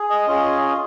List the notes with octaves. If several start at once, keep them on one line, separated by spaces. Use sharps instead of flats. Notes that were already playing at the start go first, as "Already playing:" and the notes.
Already playing: G#4
D#5
C#4 F4 G#4